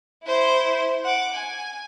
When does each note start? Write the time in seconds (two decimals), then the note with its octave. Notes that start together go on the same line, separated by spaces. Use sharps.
0.24 E4 C5
1.05 F#5 D6
1.34 G#5